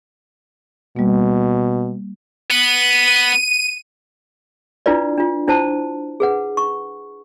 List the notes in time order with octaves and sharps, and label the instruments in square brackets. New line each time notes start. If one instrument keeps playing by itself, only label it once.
[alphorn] B2 [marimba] G3 A#3
[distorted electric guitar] B3 [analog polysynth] D#7
[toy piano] D4 E4 F4 B4 D5
D4 F4
D4 E4 C5 A5
G#4 B4 F#5
C#6